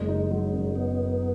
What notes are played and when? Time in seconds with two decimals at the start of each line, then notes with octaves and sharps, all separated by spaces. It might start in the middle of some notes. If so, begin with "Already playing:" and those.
Already playing: F#1 G#3
0.09 D#4
0.31 F#3 G#3
0.53 F#2
0.76 B3